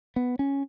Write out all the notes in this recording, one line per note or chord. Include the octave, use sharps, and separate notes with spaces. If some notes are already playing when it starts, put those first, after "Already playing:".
B3
C#4